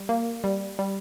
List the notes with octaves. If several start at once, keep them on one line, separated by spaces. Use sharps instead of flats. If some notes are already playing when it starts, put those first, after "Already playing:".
Already playing: G3
A#3
G3
G3